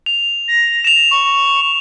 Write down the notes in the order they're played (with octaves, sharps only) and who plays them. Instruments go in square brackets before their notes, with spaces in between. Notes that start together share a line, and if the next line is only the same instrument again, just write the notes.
[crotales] F7
[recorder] A#6
[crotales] E7 F7
[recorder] C#6